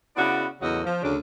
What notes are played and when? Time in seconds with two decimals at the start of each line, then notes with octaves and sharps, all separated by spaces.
0.16 C#3 B3 E4 F#4 D5
0.61 E2 A2 C#3 F#3 D#5 F#5
0.84 F3
1.02 D2 C#3 D4